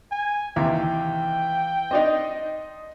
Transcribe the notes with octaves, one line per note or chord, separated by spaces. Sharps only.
G#5
D#2 C3 E3 E5 F5 G5
C4 D4 D#4 D#5